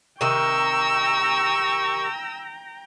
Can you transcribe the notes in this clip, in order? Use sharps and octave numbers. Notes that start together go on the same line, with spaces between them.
C3 D#3 G5 A#5 C#6 E6